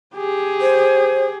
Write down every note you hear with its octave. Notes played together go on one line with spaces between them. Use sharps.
G4 G#4
C5